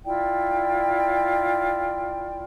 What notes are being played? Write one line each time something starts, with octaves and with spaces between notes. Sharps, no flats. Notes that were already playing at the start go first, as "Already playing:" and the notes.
E4 F4 D5 G5